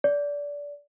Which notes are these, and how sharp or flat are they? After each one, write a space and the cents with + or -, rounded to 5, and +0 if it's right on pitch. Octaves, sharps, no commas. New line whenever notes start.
D5 -20